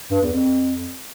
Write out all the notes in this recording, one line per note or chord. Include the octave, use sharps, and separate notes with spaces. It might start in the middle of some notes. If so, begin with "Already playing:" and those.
G2
E2
F2